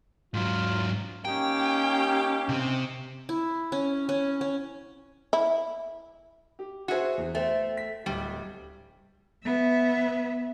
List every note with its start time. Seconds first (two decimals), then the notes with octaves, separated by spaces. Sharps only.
0.34 G#2 F#3 F4
1.25 A#3 C#4 D#4 G4 G5
2.49 C3 C4
3.29 E4
3.72 C#4
4.09 C#4
4.41 C#4
5.33 E4
6.59 G4
6.88 F#4 G#4 C5 E5 F#5
7.18 E2
7.35 A3 C5 G5
7.77 B6
8.06 D1 G3
9.43 B3 E5